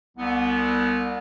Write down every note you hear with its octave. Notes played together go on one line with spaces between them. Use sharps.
C2 B3